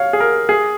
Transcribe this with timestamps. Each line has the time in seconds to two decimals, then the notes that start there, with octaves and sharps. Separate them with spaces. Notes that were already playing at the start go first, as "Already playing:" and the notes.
Already playing: C#5 F5
0.13 G#4
0.20 A#4
0.49 G#4